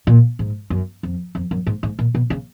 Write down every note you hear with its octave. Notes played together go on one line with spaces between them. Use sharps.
A#2
G#2
F#2
F2
F2
F#2
G#2
G#2
A#2
B2
C#3